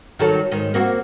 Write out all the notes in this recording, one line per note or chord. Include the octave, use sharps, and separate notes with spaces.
D#3 F#3 A4
G#2 D#3
A#3 C4 F#4